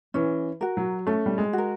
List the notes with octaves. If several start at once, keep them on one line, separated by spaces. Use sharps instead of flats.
E3 C#4
F#4 A#4
F#3
A3 C#4
G3
G#3
F#4
A#4